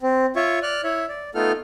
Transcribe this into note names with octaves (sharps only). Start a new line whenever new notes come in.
C4
F4 C#5 E5 C#6
D5 F6 F#6
E4 C#5 E5
D5
A3 B3 D#4 F4 A4 F6